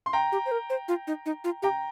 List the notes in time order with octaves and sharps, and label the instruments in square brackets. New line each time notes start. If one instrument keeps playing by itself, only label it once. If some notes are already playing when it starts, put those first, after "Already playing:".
[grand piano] C6
G5 A#5
[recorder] G4
C5
A#4
C5
F4
D#4
D#4
F4
[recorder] G4 [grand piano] G5 A#5